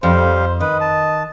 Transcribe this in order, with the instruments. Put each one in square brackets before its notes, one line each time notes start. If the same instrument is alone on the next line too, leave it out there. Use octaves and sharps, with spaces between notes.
[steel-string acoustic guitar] F2 [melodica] G3 F5 [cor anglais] C5
[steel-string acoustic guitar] D#3 [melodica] B4 [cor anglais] D#5
[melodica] A5